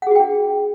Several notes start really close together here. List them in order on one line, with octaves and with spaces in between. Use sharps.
F#5 G#4 F#4 G5 D4